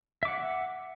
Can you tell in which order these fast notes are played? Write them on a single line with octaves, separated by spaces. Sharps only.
E5 D6 F#5